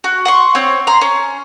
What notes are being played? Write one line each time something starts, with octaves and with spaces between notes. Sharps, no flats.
F#4
F#5 C6 C#6
C4 C#5
A#5 C6
C#4